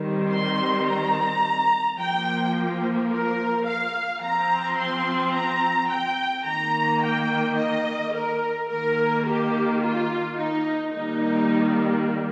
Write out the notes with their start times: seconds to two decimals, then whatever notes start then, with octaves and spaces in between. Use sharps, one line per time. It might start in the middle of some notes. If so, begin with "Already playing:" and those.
Already playing: D#3 G3 C4
0.29 C6
0.86 A#5
1.97 F3 A#3 G5
3.10 A#4
3.66 F5
4.22 F3 C4 A#5
4.78 C6
5.33 A#5
5.90 G5
6.45 D#3 A#3 A#5
7.02 G5
7.57 D#5
8.14 A#4
8.69 D#3 A#3 A#4
9.26 G4
9.82 F4
10.38 D#4
10.94 D#3 G3 A#3 D#4